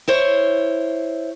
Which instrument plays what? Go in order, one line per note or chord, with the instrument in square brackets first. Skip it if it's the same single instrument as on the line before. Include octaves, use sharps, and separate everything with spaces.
[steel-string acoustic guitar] E4 C5 C#5